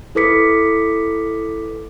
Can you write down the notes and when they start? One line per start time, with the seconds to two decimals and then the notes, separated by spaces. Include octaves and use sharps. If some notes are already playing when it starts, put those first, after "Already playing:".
0.15 E4 A4 B4 D6 B6 C#7